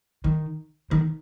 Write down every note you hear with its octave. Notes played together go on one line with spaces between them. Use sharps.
D#3
D#3